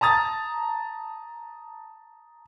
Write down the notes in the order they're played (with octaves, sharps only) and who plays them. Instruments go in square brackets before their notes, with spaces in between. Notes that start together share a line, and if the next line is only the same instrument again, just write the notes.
[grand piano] A5 A#5 D#6 A6